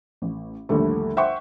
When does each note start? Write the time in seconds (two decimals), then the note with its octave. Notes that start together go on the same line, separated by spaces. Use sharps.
0.22 A1
0.69 A#1 D#2 D3 G3 A3
1.17 C5 E5 F#5 G5 C6 C#6